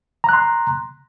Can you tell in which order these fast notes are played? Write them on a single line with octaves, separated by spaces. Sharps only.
A#5 F#6 C6